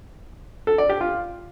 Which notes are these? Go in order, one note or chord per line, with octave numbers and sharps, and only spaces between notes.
A4
D5
G4
F4